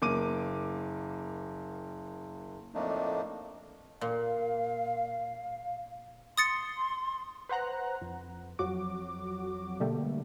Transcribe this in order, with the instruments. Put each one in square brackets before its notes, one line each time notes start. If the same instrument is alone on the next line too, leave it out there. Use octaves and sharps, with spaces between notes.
[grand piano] F#1 A#3 D6 D#7
[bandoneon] F2 A2 A3 A#3 D4 D#4
[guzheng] A#2 [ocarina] F5
[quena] C6 [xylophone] D#6 A6 C#7
[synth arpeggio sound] B4 C5 F#5 A#5 F#6
F2
F2 F#3 F#4 D6
B2 D3 G3 A3 A#3